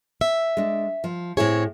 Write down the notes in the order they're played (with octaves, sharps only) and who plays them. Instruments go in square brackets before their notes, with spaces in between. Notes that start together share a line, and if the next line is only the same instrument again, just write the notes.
[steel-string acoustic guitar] E5
[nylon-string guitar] G#3 D4
F3
[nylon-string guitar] A2 E4 G#4 [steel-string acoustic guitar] C4 C#5